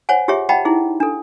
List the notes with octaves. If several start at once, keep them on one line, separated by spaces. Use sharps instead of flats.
C5 C#5 F#5 G#5
F4 G4 G#4 C#5 E5
D#5 E5 F#5 G5 A5 B5
D#4 E4 G#4
D4 A4